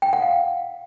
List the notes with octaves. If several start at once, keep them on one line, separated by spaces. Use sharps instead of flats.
G5
F#5
F5